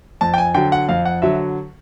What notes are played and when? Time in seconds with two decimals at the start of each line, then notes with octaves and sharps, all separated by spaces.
0.21 F2 A5
0.34 G5
0.38 G#5
0.54 D3 F#3 G5
0.72 F#5
0.89 F2 F5
1.05 F#5
1.22 D3 F#3 E5